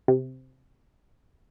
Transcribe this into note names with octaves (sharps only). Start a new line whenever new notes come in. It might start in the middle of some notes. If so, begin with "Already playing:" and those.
C3